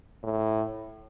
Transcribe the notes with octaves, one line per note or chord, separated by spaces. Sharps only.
A2